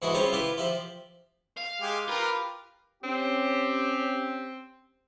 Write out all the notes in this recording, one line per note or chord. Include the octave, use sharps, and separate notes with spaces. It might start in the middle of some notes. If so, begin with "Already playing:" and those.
G#2 E3 E4 F#4 G#4
G3 C4 C#4 F4 G#4 C5
E4 F4 G4 B4
F3 G4 E5 C6
F5
G#3 G4
F4 G4 A#4 B4
C4 C#4 G4